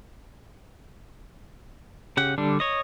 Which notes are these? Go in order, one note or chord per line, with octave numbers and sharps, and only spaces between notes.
C#3 G4 F#5
D3 G3 D4
C#5 D#5